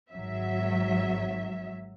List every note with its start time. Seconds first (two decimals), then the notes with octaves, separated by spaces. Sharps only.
0.12 G#1 F#3 E5